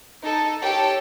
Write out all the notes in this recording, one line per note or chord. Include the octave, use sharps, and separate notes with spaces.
D#4 A4
G4 A4 C#5 G5 A5